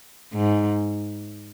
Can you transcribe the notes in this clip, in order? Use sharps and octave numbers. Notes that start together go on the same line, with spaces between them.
G#2